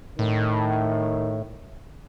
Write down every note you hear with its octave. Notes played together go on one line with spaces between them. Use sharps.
A2 D#3